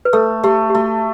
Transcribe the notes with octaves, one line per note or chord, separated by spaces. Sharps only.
B4
A3 A4
A3 G4
G4
A3 F#4